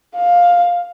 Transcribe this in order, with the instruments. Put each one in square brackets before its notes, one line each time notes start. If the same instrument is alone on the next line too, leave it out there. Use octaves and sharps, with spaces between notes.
[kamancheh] F5